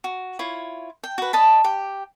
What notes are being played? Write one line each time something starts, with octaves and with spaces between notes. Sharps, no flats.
F#4
E4 F4 C#5
G5
F#4 B4
D5 D#5 A5 B5
G4 G5